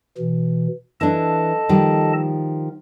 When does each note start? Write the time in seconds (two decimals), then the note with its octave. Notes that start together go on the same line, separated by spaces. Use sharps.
0.18 B2 E3
1.01 E3 D4 A4 D#5 A5
1.69 D#3 F3 G3